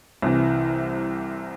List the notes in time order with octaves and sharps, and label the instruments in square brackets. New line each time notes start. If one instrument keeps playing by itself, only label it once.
[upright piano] C2 C3 E3